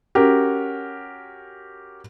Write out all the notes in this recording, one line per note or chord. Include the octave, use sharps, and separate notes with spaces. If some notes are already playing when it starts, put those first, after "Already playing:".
C#4 F#4 G4 A#4